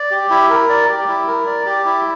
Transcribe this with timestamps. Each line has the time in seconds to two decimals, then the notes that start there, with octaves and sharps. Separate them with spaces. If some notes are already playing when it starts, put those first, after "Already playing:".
Already playing: D5
0.11 G4
0.30 E4
0.50 A#4
0.69 D5
0.88 G4
1.08 E4
1.28 A#4
1.47 D5
1.66 G4
1.85 E4